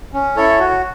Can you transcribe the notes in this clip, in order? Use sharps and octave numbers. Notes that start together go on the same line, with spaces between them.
C#4
E4 A4 C#5
F#4